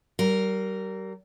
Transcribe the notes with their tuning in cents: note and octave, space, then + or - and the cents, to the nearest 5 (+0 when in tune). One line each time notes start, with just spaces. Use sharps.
G3 -35 A#4 -5